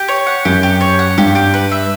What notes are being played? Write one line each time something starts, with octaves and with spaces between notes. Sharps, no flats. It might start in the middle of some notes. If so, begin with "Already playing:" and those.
Already playing: G4
C#5
F#5
F#2 G4
G4
C#5
F#5
G2 G4
G4
B4
E5